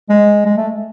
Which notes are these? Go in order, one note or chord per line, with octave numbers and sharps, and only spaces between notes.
G#3
G#3
A3